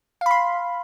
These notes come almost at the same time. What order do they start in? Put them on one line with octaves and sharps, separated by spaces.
F5 B5 C6